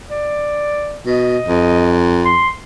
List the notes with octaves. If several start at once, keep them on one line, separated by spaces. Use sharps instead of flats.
D5
B2 D#5
F2
C6